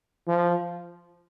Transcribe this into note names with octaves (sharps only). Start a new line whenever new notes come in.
F3